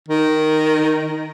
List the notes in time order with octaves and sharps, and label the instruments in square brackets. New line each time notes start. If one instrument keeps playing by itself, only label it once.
[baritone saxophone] D#3